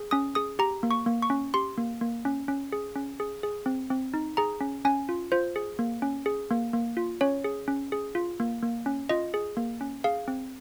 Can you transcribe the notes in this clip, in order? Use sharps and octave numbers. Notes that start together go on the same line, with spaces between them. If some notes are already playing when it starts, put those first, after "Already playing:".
Already playing: G#4
C#4 D#6
G#4 D#6
G4 A#5
A#3
C#6
A#3
C#6
C#4
G4 C6
A#3
A#3
C#4
C#4
G#4
C#4
G#4
G#4
C4
C4
D#4
G#4 A#5
C#4
C#4 G#5
F4
F4 C5
G#4
A#3
C#4
G#4
A#3
A#3
F4
C#4 C#5
G#4
C#4
G#4
F4
A#3
A#3
C#4
F4 D#5
G#4
A#3
C#4
G#4 F5
C4